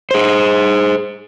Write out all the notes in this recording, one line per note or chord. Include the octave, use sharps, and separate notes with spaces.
G#4 C5